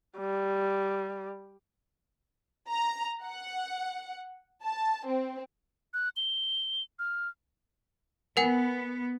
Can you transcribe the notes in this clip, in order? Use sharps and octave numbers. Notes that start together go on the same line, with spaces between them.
G3
A#5
F#5
A5
C4
F#6
G7
F6
B3 A#4 F#5 G#5